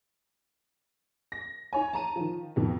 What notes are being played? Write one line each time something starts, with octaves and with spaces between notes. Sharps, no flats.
A#6
D#4 C#5 G#5
A5 A#5 D#7
D#3 F3
F2 B2 D#3